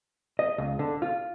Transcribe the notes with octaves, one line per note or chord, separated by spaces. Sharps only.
D#5
C#2
D3
F4